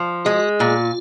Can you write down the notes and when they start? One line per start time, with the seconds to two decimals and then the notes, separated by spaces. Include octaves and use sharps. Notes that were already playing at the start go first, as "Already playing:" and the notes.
Already playing: F3
0.25 G#3 F#4
0.60 A#2 F4